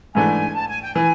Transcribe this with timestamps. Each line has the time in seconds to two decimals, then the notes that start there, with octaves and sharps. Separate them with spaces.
0.15 G#2 E3 A3 D4 G#5
0.55 A5
0.68 G#5
0.82 G5
0.94 E3 G#5